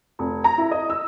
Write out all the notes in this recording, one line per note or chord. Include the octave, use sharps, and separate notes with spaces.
F1
A#5
E4
D#5
E6